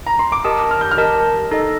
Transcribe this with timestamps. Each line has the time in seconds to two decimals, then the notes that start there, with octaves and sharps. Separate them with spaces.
0.07 A#5
0.19 C6
0.32 D6
0.44 G4 A#4 D#5 A5 D#6
0.71 F6
0.81 G6
0.91 F6
0.97 G4 A#4 D#5 A5
1.51 D#4 A4 D#5